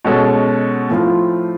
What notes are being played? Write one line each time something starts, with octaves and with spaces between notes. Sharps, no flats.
B2 G#3 C#4 F#4 A4
A2 F3 A3 C4 F4